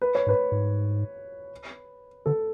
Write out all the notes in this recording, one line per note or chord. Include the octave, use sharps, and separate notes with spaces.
B4
C#5
G#2 B4
G#2
D3 A4